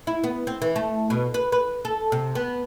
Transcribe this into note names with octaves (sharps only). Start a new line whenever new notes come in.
E4
B3
C4
E3
A3
B2
B4
B4
A4
C3
B3